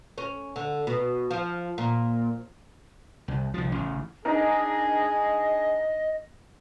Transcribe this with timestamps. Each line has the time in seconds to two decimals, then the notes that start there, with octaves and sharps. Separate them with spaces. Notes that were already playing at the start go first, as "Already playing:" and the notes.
0.18 C#4
0.56 D3
0.87 B2
1.31 F3
1.78 A#2
3.28 C2
3.54 C2 F3
3.72 A1 C#3
4.25 D4 D#4 G#4 A#4 D#5